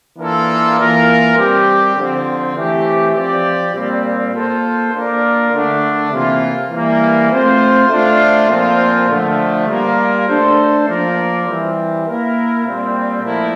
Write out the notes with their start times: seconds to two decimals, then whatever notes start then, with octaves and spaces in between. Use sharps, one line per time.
0.18 E3 A#3 D4 F4 A4
0.79 E3 A#3 F4 A#4
1.37 G3 C4 G4
1.96 D3 F3 C4
2.56 E3 A3 C4 G4
3.15 F3 C4 G4 D5
3.75 A#2 G3 C4
4.34 A#3 F4 A4 C5
4.93 A#3 D4 F4 A#4 D5
5.53 D3 A3 D4
6.12 C3 E3 A#3 F4
6.71 E3 G3 A#3
7.30 A3 C4 F4 C5
7.89 A3 D4 F4 C5
8.49 A#2 F3 C4 F4 C5
9.09 D3 F3 A3
9.68 G3 A#3 F4 A#4 D5
10.27 A3 D4 A4 C5
10.87 F3 A#3 F4 A#4 D5
11.46 E3 G3 C4
12.05 A#3 E4 A#4
12.65 A#2 G3 C4
13.24 A#2 F3 A3 E4 A#4